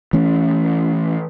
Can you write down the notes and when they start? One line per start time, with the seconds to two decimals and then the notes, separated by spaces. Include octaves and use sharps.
0.13 E3 A3 C#4